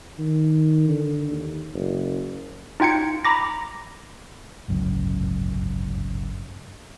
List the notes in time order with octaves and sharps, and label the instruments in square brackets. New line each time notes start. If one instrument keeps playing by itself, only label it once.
[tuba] D#3
D3
D#2
F#1
[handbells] D#4 F4 G5 G#6 C#7
A#5 B5 D6 A#6
[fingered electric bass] G1 C#2 F#2 A2